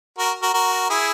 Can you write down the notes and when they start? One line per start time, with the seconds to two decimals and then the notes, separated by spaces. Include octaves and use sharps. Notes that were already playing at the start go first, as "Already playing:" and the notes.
0.18 F#4 A#4
0.42 F#4 A#4
0.54 F#4 A#4
0.90 E4 G#4